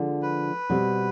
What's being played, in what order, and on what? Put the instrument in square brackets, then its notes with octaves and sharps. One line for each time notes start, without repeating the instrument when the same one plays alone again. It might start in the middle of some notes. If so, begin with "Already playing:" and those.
Already playing: [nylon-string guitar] D3 F3 G#3
[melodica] B4
[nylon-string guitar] B2 G3 C4